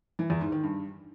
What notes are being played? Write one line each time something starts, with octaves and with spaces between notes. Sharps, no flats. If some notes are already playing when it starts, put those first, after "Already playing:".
E3
E2
G#2
D#3
G2